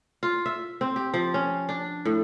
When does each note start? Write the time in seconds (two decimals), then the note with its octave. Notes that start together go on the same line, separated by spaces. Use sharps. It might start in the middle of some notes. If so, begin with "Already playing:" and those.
0.23 F4
0.46 E5
0.81 C4
0.96 G4
1.14 F3
1.34 C#4
1.69 D4
2.05 A2